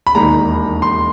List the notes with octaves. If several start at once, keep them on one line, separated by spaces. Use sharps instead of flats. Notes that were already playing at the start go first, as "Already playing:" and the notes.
B5
E1 D#2 D#3 A#5
C6